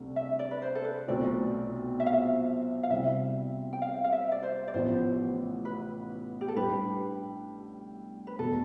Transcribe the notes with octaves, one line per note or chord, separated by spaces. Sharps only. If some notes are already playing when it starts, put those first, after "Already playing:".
Already playing: C2 C3 A3 D4
E5
D5
B4
C5
A4
B4
B1 B2 A3 C4 F4 D5
E5
F5
E5
F5
C2 C3 G3 C4 E4 E5
G5
F5
F5
E5
D5
C5
D5
A1 A2 F3 B3 C5
B4
G4
A4
A2 G3 D4 G4 B4
B4
E1 B2 A3 A4